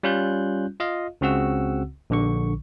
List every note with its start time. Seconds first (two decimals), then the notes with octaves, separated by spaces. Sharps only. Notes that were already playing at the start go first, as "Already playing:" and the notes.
0.03 G3 C#4 F4 F#6 G6
0.80 F4 D#5 F5
1.21 C#2 C#3 C4 F#4 F#5 E6
2.10 A#1 D3 C#6